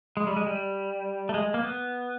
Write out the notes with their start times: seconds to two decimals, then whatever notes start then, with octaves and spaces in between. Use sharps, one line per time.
0.17 G#3
0.27 G3
0.36 G#3
0.47 G3
1.29 A3
1.34 G#3
1.54 A#3
1.64 B3